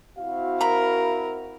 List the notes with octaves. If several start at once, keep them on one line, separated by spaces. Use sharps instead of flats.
C4 E4 F#4 F5
A#4 A#5 B5